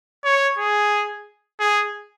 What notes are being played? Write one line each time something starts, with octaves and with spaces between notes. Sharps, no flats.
C#5
G#4
G#4